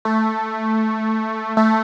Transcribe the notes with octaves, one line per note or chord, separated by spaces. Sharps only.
A3
A3